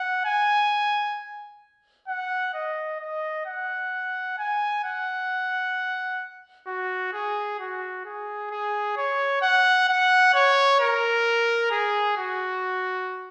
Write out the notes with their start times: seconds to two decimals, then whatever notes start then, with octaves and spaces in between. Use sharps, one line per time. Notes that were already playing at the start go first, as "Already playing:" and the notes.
Already playing: F#5
0.25 G#5
2.08 F#5
2.54 D#5
3.00 D#5
3.46 F#5
4.38 G#5
4.84 F#5
6.67 F#4
7.13 G#4
7.59 F#4
8.05 G#4
8.51 G#4
8.97 C#5
9.42 F#5
9.89 F#5
10.34 C#5
10.80 A#4
11.71 G#4
12.17 F#4